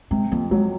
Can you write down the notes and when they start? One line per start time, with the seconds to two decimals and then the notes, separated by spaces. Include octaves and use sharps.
0.11 C3 G#3
0.32 F2 A#3
0.51 F#3 G#3